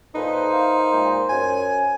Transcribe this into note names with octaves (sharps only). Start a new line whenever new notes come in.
A#2 D#4 A4 B4 C5
A#4 E5 F5
A#2 G#3
F#2 G#5